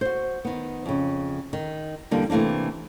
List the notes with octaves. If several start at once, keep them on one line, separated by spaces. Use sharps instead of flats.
F#4 C5
D#3 B3
F2 C#3
D#3
E2 D3 G3 A#3
C3 E3 A3 A#3 D4